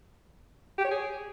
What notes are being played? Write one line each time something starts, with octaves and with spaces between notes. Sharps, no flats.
G4
C#5
G#4